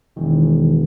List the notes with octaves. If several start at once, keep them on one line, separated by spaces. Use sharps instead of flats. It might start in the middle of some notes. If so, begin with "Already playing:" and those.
E1 D#3 E3